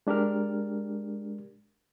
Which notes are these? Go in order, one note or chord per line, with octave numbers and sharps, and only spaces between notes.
G#3 D4 G4 A#4 F6